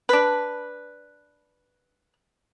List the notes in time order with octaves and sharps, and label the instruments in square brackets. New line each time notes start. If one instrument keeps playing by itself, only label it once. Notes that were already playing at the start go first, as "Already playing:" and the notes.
[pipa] D4 B4